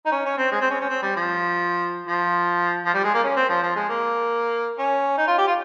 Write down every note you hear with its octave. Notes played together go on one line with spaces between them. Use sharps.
D#4
C#4
C#4
C4
G#3
C4
C#4
C#4
C4
G3
F3
F3
F3
G3
G#3
A#3
C#4
C4
F3
F3
G#3
A#3
C#4
D#4
F4
G4
F4